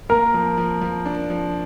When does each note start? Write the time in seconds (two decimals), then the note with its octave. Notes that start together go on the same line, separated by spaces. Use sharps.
0.09 A#3 A#4
0.34 F3
0.58 F3
0.81 F3
1.05 D4
1.30 F3